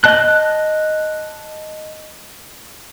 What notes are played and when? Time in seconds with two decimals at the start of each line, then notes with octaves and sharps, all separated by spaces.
0.04 D#5 A5 F#6